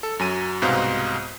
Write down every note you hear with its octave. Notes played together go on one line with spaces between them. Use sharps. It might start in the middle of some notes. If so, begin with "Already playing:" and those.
A4
F#2 F#3 G#5 D#7
C2 G#2 B2 C5 F5